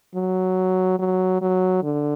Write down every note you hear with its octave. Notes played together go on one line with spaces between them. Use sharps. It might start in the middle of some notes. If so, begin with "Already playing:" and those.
F#3
F#3
F#3
D3